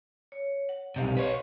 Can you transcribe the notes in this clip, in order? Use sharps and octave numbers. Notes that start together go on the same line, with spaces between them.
C#5
F#5
B1 C3 G4 D#5 F5
B4 C#5 F#5